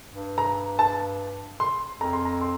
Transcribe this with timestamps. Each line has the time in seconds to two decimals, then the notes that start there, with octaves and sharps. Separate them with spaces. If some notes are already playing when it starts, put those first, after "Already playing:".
0.11 G2
0.38 A#5
0.79 A5
1.60 C6
2.01 F2 A#5
2.13 C6
2.25 A#5
2.41 C6